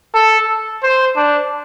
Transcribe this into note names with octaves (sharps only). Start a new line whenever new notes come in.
A4
C5
D4